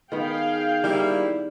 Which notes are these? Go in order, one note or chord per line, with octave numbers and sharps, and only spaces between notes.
D#3 B3 G#4 F5 G5
G3 A#3 E4